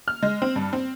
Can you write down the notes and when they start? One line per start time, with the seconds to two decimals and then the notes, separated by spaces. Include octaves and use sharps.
0.08 F6
0.23 G#3
0.42 C4
0.56 G2
0.73 C4